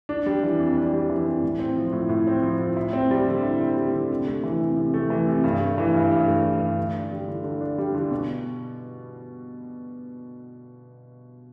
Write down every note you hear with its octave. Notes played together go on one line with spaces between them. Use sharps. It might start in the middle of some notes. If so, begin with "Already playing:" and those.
D4
G3
E3
F2
D4
G3
E3
F2
A2
C4
F3
A2
A2
C4
F3
A2
E4
C4
G3
D3
E4
C4
G3
D3
C3
A3
E3
C3
C3
A3
E3
C3
G2
A3
E3
G2
G2
A3
E3
G2
D3
D4
G3
D3
D3
D4
G3
D3
B2